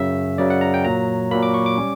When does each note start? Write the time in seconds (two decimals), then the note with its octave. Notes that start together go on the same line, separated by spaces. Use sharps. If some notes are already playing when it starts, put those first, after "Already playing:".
Already playing: F#2 C#3 F#3 E5
0.38 F#2 C#3 F#3 D5
0.50 F#5
0.61 A#5
0.74 G5
0.85 A#2 F#3 A#3 A#5
1.31 A#2 F#3 A#3 B5
1.43 D6
1.54 C#6
1.66 D6
1.78 G3 C#4